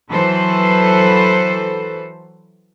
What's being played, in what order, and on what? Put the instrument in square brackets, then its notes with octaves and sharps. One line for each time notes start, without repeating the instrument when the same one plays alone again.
[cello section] E3 F#3 A4 B4 C5